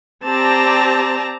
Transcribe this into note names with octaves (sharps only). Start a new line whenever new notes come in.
C4 G4 D5 A5 A#5